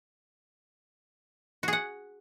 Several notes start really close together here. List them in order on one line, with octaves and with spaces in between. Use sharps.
F#4 G#4 F#5